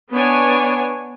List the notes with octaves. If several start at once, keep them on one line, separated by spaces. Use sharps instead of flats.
B3 D4 C#5 G#5